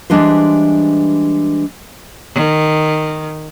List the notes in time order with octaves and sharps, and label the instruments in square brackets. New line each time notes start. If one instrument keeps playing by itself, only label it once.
[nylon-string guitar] E3 G3 G#3 D4 B4 C5
[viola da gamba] D#3